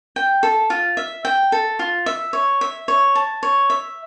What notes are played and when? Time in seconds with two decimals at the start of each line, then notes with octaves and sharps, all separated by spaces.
0.16 G5
0.43 A4
0.70 F4
0.97 E5
1.25 G5
1.52 A4
1.79 F4
2.06 E5
2.33 C#5
2.61 E5
2.88 C#5
3.15 A5
3.43 C#5
3.70 E5